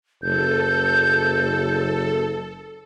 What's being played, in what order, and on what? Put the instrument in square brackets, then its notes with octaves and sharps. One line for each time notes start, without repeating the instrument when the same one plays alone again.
[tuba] F#1 [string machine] A4 [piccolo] G6